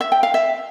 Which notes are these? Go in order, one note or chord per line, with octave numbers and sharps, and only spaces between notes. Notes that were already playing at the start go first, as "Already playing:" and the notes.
E5
G5
F5
E5